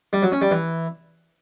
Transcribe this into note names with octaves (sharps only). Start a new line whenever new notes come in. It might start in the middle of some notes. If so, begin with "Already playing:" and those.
G3
F#3
C#4
G3
E3